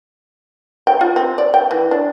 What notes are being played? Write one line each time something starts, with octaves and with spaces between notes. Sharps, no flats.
G5
F4
C4
D5
G5
E3
D4